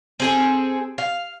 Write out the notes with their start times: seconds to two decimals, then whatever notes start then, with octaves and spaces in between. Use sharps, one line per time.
0.20 C4 G#4 A4
0.98 F5